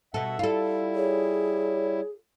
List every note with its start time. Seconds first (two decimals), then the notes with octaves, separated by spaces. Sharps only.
0.14 B2 A4 E5 F#5
0.39 G3 E4 F4 A4
0.95 G#4 C#5